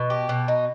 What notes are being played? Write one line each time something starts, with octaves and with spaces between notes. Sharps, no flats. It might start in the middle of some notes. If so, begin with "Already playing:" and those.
Already playing: B2
G4
B2
D#4